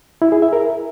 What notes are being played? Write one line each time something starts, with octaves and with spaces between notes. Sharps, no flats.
E4
G#4
E5
A#4